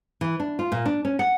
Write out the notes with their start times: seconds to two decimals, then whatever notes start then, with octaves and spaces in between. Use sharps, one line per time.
0.21 E3
0.40 D4
0.59 F4
0.72 A#2
0.86 D4
1.05 C#4
1.19 F#5